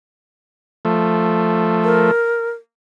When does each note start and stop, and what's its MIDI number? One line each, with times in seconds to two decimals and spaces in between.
0.85 2.11 53
0.85 2.11 57
1.84 2.48 70